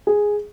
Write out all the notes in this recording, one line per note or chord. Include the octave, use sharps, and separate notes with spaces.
G#4